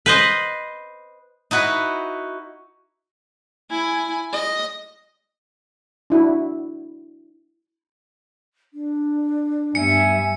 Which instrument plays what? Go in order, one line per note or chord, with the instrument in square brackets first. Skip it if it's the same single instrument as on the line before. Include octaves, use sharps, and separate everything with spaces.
[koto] B4 C5 D#5
[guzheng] D#4 E4 F#4 B4
[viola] E4 G#5
D#5
[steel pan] D4 E4 F#4
[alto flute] D4
[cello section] G2 B3 E5 [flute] G#5 [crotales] C#7